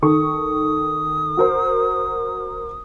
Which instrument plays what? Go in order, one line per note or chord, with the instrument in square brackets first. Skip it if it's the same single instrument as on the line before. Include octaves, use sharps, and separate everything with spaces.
[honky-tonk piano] D#3 A4 C#6 [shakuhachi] D#6
[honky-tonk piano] F#4 A#4 C5